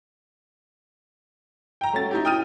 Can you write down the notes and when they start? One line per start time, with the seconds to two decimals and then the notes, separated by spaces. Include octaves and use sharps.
1.81 G5 A#5
1.93 A3 C#4 F#4 A6
2.11 D#4 E4 G4
2.25 G5 D#6 F6 D#7